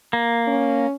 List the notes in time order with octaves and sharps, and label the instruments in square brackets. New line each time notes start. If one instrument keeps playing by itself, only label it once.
[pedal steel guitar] A#3
[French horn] C#4